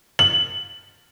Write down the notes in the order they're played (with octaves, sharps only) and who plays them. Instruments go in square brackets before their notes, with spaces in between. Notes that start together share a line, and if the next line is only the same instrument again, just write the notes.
[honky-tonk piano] F#7